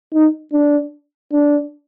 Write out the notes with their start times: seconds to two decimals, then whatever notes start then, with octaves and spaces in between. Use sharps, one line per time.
0.13 D#4
0.53 D4
1.33 D4